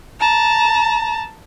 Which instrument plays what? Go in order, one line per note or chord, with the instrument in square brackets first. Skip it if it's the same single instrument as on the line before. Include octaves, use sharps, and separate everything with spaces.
[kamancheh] A5 A#5